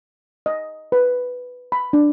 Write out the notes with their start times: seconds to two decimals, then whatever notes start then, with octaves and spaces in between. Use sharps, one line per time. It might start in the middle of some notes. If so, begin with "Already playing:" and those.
0.46 D#5
0.92 B4
1.72 B5
1.93 D4